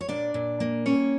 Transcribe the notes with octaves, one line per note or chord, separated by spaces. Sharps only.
C#5
A#2 D4 D5
A#2
A#3
G3 C#4 C#5